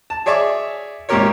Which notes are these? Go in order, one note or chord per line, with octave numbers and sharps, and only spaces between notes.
A5
G#4 C#5 D5 E5 C#6 D6
G#1 A#2 C#4 G4 A#4 C#5